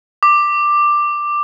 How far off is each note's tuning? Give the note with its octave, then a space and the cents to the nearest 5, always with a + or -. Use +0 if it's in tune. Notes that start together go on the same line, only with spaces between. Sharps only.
D6 +10